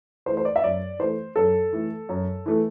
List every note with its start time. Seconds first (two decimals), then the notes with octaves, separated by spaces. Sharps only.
0.26 E3 C5
0.30 A3
0.37 C5
0.45 D5
0.56 E5
0.64 F#2 D5
0.99 E3 A3 C5
1.36 F#2 A4
1.73 E3 A3
2.09 F#2
2.46 E3 A3